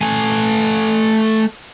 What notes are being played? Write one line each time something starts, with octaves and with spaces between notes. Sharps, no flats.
A3 G#5